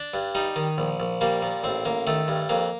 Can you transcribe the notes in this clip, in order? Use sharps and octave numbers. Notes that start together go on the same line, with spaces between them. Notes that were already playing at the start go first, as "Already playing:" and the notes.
Already playing: D4
G2
G3 D#4
D#3
A#1
A#1
G3 A#3
A#2
A1 C4
A1 A#3
D#3 A3
G2
F2 A#3